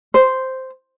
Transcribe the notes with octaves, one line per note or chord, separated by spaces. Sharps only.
C5